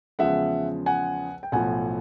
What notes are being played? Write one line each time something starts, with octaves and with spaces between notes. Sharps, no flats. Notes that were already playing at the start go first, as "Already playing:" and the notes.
E2 C#3 F3 G#3 E5 F#5
F#5 G#5
G5
B1 A2 F3 F#5 G#5